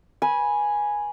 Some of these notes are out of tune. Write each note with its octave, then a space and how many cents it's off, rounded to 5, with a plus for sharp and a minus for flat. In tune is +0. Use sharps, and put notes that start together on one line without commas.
B4 -25 G#5 +0